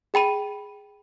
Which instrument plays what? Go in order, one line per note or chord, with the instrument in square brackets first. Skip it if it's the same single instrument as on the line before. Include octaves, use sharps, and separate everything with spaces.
[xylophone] G#4 G5 B5 D#7